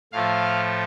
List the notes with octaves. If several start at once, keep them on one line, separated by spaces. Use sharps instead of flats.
A2 F3 A3 F5